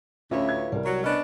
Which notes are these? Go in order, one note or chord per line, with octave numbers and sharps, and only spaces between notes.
D2 A2 C#4 F4 B4 C#5 E5
G#6
C2 G3 A#4
F#3
B3 C#4 D4 D#5